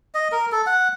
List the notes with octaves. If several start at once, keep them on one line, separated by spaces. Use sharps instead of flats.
D#5
A#4
A4
F#5